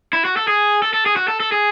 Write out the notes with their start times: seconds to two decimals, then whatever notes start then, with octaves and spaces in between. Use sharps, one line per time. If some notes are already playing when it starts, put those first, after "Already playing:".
0.13 E4
0.25 F#4
0.37 A4
0.48 G#4
0.82 A4
0.93 A4
1.06 G#4
1.16 F#4
1.28 A4
1.40 A4
1.52 G#4